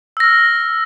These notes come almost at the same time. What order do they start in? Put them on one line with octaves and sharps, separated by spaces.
E6 A#6 F6